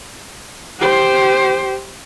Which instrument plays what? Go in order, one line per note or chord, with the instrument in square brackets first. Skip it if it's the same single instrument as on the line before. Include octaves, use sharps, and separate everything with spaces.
[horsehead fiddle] G4 C5